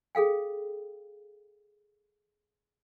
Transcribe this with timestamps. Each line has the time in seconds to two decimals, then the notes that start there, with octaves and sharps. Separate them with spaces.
0.15 G#4 A4 F5 G5